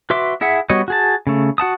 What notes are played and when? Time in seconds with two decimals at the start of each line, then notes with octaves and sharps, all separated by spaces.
0.10 F#4 B4 E5 C6 D6
0.41 E4 G#4 E5 F#5
0.70 G3 B3 F#4 C#5 D#5
0.88 F#4 G#4 A5
1.27 C#3 A3
1.58 F#4 F#5 A5 D#6